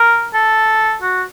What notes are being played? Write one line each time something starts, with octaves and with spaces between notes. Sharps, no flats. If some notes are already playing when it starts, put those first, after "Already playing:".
Already playing: A#4
A4
F#4